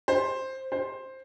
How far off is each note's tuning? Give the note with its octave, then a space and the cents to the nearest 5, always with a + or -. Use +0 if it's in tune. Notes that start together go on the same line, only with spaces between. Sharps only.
C5 +10
C5 +10